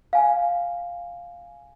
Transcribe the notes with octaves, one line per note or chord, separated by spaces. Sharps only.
F5 G#5